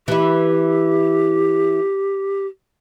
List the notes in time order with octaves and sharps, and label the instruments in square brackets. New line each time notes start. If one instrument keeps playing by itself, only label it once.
[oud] E3 E4 [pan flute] G4